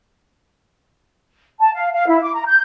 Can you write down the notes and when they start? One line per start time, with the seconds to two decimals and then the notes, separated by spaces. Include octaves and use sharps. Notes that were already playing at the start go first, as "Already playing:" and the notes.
1.60 A5
1.74 F5
1.94 F5
2.07 E4
2.22 D6
2.34 A#5
2.46 G6